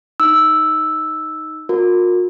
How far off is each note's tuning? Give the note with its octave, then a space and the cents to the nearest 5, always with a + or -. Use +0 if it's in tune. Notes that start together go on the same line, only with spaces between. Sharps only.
D#4 +0 E6 +0
F4 +45 A#4 -10